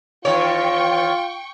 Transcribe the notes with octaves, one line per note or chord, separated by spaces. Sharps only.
E2 D#3 F4 C#5 G5 C#6